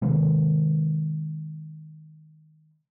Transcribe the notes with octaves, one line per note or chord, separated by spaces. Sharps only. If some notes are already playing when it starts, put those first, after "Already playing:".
C3 D#3 G#3